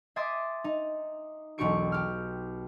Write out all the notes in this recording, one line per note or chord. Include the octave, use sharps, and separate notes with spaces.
E5 G#5 C6 D6 D#6 A6
D#4
E1 B1 D#4 G4 C#6 D7
G4 F6